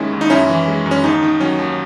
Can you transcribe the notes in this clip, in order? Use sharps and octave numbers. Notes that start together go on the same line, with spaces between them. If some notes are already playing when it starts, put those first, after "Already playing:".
Already playing: D#2 D#3 G#3 C#4 E4
D#2
D#4
F#2 C#4 E4
E3
G#3
F#2
C#4
D#2 D#4
D#3
F#3 C#4
D#2